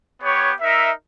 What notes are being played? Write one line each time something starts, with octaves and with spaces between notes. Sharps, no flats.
B3 G4 C#5
D#4 A#4 E5